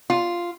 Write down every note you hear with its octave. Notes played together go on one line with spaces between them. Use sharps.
F4